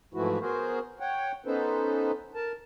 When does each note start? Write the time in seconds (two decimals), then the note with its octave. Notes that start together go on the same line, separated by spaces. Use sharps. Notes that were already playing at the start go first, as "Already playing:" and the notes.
0.14 G#2 E3 F3 A3 E4 F#4
0.41 B3 F#4 G#4 A#4 C5
1.00 C#5 F#5 G5
1.46 B3 C#4 D#4 A4 B4 C5
2.35 A#4 A5